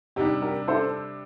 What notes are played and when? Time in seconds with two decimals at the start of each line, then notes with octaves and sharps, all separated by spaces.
0.16 C3 G3 D4 D#4 G4
0.42 G4 A#4
0.68 A4 C5